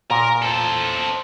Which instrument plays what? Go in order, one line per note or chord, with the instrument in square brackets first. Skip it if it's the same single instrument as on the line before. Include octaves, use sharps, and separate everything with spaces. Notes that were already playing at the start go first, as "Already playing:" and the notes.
[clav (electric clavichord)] A#2 [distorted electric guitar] A#4
[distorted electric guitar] A4 C5